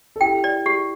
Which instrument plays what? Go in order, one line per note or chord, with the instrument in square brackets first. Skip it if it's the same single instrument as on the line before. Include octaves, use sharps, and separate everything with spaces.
[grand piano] A4
[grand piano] E4 G4 [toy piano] G5
[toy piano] D5
G4